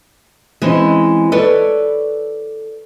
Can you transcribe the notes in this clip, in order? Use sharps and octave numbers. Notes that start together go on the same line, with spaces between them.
E3 G#3 C4 C#4
A4 B4 C#5 D5